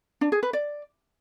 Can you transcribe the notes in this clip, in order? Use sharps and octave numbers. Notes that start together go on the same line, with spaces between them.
D4
G#4
B4
D5